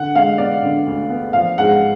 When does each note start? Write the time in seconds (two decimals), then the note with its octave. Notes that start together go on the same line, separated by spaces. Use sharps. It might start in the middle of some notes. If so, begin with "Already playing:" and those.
Already playing: D3 F#5
0.15 G#3 F5
0.38 B3 D5
0.63 D3
0.87 D2
1.10 B3
1.33 F3 F5
1.58 G#2 F#5